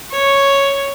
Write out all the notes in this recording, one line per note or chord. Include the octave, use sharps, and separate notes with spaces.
C#5